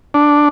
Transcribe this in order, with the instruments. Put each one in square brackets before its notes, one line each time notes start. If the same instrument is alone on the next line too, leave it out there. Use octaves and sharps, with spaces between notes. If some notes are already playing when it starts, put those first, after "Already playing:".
[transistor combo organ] D4